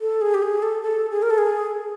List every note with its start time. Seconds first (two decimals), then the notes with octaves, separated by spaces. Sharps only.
0.01 A4
0.21 G#4
0.34 G4
0.42 G#4
0.63 A4
0.82 A4
1.11 G#4
1.22 A#4
1.30 A4
1.38 G#4